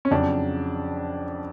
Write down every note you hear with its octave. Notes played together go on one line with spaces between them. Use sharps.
C#4
F2 C#3 F#3 D4